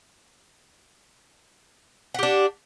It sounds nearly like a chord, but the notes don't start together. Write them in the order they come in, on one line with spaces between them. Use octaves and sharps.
F#5 G4 D4